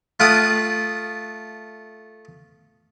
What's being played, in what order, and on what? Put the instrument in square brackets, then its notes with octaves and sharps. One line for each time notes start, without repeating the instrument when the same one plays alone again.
[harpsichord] A3 F4 F#5 G5 D#6